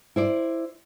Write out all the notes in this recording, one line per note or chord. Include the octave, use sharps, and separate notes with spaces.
E4 C5 D5